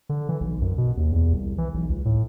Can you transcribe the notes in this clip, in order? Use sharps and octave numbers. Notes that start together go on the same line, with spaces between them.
D3
E3
B1
F#2
B2
D#2
E2
C2
E3
B1
C#2
A2